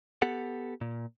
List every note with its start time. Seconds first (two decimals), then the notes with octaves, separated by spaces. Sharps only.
0.22 B3 G4 A4 F#5
0.81 A#2